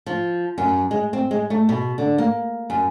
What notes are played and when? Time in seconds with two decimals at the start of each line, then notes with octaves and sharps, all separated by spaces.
0.06 F3
0.58 F#2
0.91 G#3
1.13 C4
1.31 G#3
1.50 A3
1.69 B2
1.98 D3
2.18 A#3
2.70 F#2